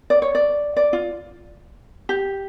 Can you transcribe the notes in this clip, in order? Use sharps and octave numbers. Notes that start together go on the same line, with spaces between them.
D5
C#5
D5
D5
F4
G4